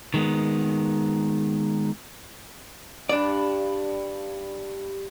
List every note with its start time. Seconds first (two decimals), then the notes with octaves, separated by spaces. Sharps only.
0.14 D#3 G#3 B3
3.09 G2 D4 D5